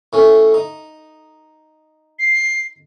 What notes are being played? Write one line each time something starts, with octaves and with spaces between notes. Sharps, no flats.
A2 A3 C#4
D#4
C7